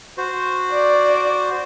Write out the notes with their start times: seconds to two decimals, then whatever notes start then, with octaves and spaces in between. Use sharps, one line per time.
0.18 F#4 C5
0.71 D5